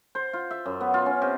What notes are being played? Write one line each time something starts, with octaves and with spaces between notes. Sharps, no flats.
C5
F4
E5
F#2
B3
F4
C#4
C3